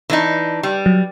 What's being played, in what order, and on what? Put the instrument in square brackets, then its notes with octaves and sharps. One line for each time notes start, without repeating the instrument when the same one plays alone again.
[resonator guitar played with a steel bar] E3 D4 D#4
G3
[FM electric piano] F#3